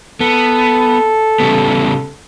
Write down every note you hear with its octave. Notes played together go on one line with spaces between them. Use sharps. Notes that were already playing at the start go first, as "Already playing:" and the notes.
B3 A4
C#3 G3 B3